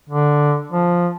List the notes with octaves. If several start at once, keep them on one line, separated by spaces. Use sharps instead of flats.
D3
F3